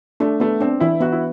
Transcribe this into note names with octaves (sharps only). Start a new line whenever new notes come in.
A3 D4
A3 B3
C4 D4
E3 E4
B3 F#4
E4